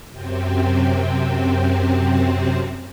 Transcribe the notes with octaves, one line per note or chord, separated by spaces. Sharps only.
F#2 C3 C4